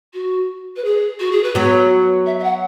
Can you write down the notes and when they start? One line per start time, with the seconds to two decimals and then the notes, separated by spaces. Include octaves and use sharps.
0.13 F#4
0.76 B4
0.84 G#4
1.20 F#4
1.31 G#4
1.43 B4
1.55 F#3 B3 C#5
2.26 E5
2.39 E5
2.44 F#5